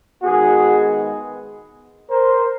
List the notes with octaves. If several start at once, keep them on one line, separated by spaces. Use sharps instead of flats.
D#3 G#3 B3 F#4 G#4
A#4 C5